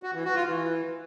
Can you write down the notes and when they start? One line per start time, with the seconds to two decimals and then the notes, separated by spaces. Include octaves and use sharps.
0.03 F#4
0.14 E3
0.25 F#4
0.35 F4
0.46 E3